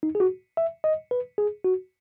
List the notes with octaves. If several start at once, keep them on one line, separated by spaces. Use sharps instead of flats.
D#4
G#4
F#4
E5
D#5
B4
G#4
F#4